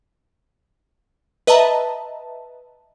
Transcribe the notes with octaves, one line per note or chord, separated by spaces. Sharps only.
B4 D#5 E5 A5 A#5